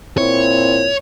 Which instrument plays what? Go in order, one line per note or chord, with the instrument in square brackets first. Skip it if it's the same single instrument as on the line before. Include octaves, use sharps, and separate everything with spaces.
[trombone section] A#2 C4 E4 [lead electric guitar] C#5